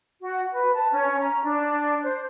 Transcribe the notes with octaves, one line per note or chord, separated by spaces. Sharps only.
F#4
B4
A5
C#4
A#5
D4
C5